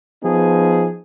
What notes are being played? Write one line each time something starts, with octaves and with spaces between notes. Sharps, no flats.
F3 B3 D#4 G#4